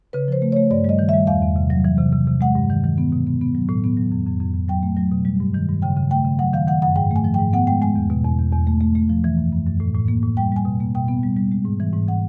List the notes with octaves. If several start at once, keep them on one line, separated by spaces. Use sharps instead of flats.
C#3 B4
F3 C5
A3
A3 C#5
G2 D5
G3 D#5
D#3
G3 E5
E2 F5
E2
C3
F#3
E3
C3
C3
C3
G#3 F#5
G2
D#3
D#3
B3
B2
B3
B3
F#3
A2
B3
F#3
F2
F2
F2
F2
F#3 G5
A3
F#3
B2
G3
G2
D#3
G2
C#3 G5
C#3
A3 G5
C#3
F#3 F#5
D#3 F5
D#3 F#5
F#2 F#5
G#2 G5
A3 G#5
F3
G#2 G5
B3 F#5
G#3 G5
G#3 G#5
E2
B2
E2
E2
E2
A3
A3
A3
F3
E3
F#2
F#2
F#2
A2
A2
A#3
A2
G3 G5
G3 G#5
B2
A#3
B2 G5
B3
G3
G3
G#3
G#2
E3
G#2
E3 F#5